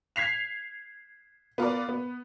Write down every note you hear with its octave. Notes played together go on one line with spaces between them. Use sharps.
G#6 B6 C7 F7
B3 F4 A#4 D5
B3